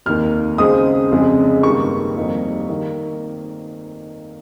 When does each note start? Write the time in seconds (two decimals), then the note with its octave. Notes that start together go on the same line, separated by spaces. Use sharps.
0.06 F1 D#2 D#3 A#3 F6
0.58 C#2 C#3 G#3 C4 D#6
1.11 F1 F2 C#3 G#3
1.63 G2 D#3 G3 A#3 C#6
2.16 F1 F2 D#3 G3 A#3
2.69 D#3 A#3